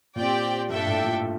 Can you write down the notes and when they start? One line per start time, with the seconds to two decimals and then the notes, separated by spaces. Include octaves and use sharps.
0.16 A#2 C4 G4 D5 G5
0.69 G2 D4 A4 E5 G5
0.87 A2
1.05 A#2